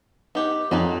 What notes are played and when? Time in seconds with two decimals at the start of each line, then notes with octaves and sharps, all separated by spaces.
0.35 B3 D#4 G4 B4
0.71 F2 F#3 D#4 B4